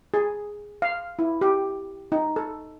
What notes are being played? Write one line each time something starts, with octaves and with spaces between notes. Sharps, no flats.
G#4
F5
E4
G4
D#4
A4